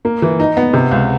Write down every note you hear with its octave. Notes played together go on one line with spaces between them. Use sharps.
A#3
E3
D#4
B3
C3
C#2